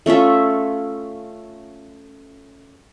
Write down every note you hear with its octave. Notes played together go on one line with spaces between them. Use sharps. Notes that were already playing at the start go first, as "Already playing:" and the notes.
A3 C#4 F4 E5